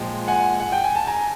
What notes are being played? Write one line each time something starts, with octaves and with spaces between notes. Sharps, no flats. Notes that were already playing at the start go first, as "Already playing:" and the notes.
Already playing: A#2 F3 G#3 G5
F#5 G#5
F#5
G5
G#5
A5
G#5 A#5